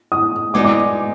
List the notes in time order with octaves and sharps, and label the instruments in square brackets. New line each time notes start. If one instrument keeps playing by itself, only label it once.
[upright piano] D#6
[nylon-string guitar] G#3 B3 D#4 F#4 D5 [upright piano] D6
[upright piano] D6